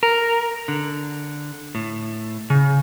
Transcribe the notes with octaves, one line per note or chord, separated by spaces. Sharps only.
A#4
D3
A2
C#3